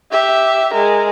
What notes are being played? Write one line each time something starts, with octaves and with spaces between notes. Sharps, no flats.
G4 E5
G#3 A#4